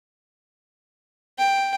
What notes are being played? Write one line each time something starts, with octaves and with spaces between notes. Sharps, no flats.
G5